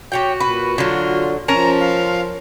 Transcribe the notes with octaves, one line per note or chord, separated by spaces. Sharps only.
F#4 G4 C#5 G5
A#2 B4
D3 F#3 F4
F3 C#4 A#4 A5 A#5
F5